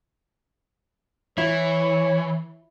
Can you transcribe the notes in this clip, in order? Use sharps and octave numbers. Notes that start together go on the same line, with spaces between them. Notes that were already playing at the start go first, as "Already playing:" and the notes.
E3 E4 C#5